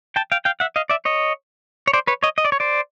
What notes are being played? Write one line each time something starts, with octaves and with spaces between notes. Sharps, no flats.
G5 A5
F5 G5
F5 G5
E5 F#5
D#5 F5
D5 E5
C#5 D#5
C#5
C5 D5
B4 C#5
C#5 D#5
D#5
D5
C#5
C5 D5